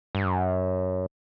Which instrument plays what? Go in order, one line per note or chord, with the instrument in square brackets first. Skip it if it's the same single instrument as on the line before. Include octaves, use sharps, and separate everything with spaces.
[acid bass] G2
F#2